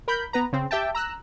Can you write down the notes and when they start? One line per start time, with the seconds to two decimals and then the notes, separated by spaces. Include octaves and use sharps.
0.08 A#4 B5 G6
0.33 B3 B4 A#5
0.53 C#3 C4
0.71 G4 E5 G5 A5
0.95 A#5 E6 F#6